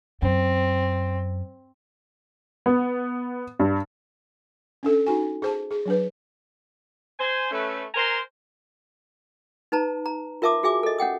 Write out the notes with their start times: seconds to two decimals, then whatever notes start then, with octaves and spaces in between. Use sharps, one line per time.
0.22 F#2 C4
2.66 B3
3.59 G2
4.83 C#4 D4 A4
5.06 D#4 F#4 G#5
5.42 G#4 C5 A5
5.71 G#4
5.86 F#3 D4 B4
7.20 C5 G#5
7.51 A3 C#4 B4
7.94 A#4 C5 G#5 A#5 C6
9.72 D#4 B4 A5 A#5
10.06 A#5
10.42 F4 A#4 E5 A5 D6 D#6
10.63 F#4 G#4 E5 G#5 D6
10.83 A4 D#5
10.98 C#4 F#5 G5 D#6